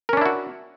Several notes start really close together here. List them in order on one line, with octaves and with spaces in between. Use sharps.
A#4 C#4 D4 E4 F#4